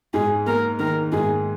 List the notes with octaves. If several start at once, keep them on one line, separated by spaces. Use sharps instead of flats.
G#2 G#4
A#3 A#4
D#3 A#4
G#2 G#4